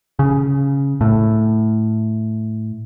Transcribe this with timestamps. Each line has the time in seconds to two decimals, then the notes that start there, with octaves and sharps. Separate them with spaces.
0.19 C#3
1.01 A2